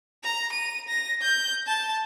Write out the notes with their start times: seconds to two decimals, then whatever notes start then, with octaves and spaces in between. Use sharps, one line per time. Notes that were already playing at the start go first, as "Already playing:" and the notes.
0.24 A#5
0.52 D#7
0.88 A#6
1.22 G6
1.67 A5